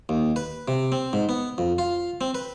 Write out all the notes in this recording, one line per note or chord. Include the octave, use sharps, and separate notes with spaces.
D#2
B4
C3
C4
G#2
B3
F2
F4
C4
B4